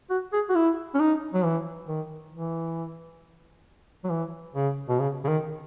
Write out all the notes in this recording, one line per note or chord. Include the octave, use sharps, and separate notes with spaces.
F#4
G#4
F#4
E4
C#4
D#4
F#3
E3
D#3
E3
F#3
E3
C#3
B2
C#3
C#3
D#3